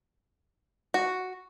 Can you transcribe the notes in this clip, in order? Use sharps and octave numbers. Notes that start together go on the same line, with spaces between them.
F#4